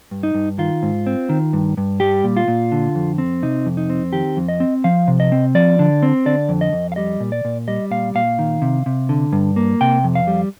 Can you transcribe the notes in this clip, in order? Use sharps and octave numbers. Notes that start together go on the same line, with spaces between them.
G2
D#4
G2
D#3 F4
G#2
C4
D#3
G2
G2
G3 G4
A#2
F4
A#2
D3
F2
C4
C3 D#4
F2
D#4
C4
D#3 G4
F2
D#5
C4
F3 F5
C3
D#5
C4
F3 D5
D3
C4
D3 D5
F2
D#5
F2
F5
G3 D#5
A#2
D5
A#2
G3 D#5
A#2 F5
A#2 F5
D#3
C3
C3
D3
G2
A#3
C3 G5
F2
F5
G3